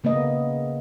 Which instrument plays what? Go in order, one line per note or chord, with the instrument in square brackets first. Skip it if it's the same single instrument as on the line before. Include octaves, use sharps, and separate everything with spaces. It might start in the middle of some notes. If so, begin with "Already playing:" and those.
[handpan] C#3 A#3 B3 D#5